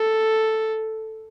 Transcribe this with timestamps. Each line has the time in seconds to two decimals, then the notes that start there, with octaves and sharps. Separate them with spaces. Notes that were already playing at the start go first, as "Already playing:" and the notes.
Already playing: A4